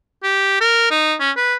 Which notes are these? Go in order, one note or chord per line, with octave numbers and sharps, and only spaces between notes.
G4
A#4
D#4
C#4
B4